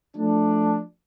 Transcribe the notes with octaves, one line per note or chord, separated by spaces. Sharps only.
F3 A3 D4